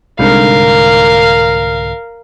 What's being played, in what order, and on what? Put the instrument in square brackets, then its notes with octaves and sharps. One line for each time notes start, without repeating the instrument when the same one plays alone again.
[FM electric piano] C2 G#2 D3 [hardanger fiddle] A#4 F5